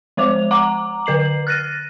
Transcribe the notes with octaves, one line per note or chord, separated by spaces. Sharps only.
F3 G#3 C5 D6 F7
F#5 A#5 D6
D3 B4 C7 F#7
F6 F#6 A6 A#6 D#7